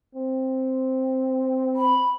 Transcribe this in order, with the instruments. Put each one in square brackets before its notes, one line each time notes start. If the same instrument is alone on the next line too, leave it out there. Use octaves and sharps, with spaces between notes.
[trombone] C4
[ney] B5